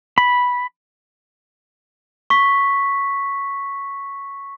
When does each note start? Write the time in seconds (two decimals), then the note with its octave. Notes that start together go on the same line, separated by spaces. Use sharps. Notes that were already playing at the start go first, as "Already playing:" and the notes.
0.18 B5
2.30 C#6 B6